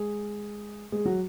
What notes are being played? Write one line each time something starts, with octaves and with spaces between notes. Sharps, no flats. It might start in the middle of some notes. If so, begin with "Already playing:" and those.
Already playing: G#3 G#4
G#3 G#4
F#3 F#4